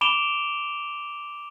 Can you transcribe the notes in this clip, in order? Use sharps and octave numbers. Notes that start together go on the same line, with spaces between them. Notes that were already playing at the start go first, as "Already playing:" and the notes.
B5 D6 D7 E7 F7 G7